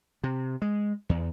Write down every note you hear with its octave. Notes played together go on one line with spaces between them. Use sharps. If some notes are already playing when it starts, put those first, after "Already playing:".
C3
G#3
E2